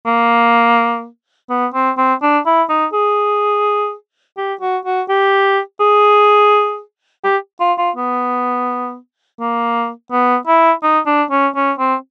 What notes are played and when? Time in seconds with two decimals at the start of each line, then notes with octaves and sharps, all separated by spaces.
0.06 A#3
1.49 B3
1.74 C4
1.97 C4
2.22 D4
2.46 E4
2.69 D#4
2.93 G#4
4.37 G4
4.61 F#4
4.85 F#4
5.09 G4
5.80 G#4
7.24 G4
7.60 F4
7.78 F4
7.96 B3
9.40 A#3
10.11 B3
10.47 E4
10.83 D#4
11.06 D4
11.31 C#4
11.55 C#4
11.78 C4